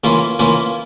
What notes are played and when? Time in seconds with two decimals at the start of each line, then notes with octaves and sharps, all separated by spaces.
0.04 E3 A#3 C#4 F4
0.39 E3 A#3 C#4 F4